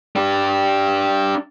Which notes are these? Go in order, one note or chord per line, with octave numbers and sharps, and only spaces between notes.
D4 G4